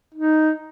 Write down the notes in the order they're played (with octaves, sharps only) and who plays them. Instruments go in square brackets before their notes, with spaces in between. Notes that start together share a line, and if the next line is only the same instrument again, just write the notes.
[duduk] D#4